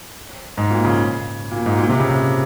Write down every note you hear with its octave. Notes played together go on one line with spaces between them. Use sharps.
G#2
A#2
C#3
A#2
G#2
A#2
C3
C#3
C3